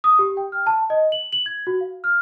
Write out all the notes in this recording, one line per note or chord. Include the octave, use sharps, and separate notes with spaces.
D#6
G4
G5
F6
A5
D#5
F#7
F#7
G#6
F#4
F5
F6